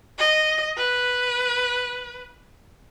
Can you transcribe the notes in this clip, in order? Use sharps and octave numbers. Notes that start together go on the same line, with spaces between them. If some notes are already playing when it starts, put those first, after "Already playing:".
D#5
B4